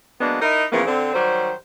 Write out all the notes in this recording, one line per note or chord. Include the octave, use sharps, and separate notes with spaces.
F#3 G#3 A#3 B3 D4
D#4 E4 A#4 D#5
C#3 E3 F3 A#3 B3
D3 C4
D#3 F#3 G3 C5